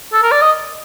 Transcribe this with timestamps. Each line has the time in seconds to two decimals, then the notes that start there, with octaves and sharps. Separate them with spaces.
0.13 A4
0.23 A#4
0.32 D5
0.42 D#5